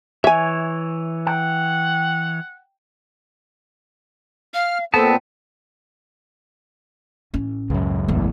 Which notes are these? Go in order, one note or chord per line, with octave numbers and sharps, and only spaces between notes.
E3 C#5 E5 G#5
F#5 G5
F5 F6
A#2 B3 C4 A4 A5
A1 C#4
C#2 F#2
A1 E2